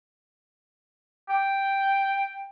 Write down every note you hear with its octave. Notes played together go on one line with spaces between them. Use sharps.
G5